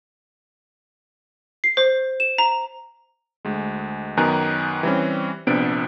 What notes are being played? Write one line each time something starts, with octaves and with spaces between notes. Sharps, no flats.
C7
C5
E7
A#5
D2 G#3
F#2 D#3 B3 G#5 A#5 F#6
E3 G3 C4 C#4
A#1 C3 B3 D4 D7